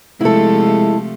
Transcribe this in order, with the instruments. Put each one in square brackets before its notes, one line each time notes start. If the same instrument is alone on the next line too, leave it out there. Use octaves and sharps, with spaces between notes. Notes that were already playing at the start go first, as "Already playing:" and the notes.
[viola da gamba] C3 F3 A3 [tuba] G#3 [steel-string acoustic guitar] E4 A4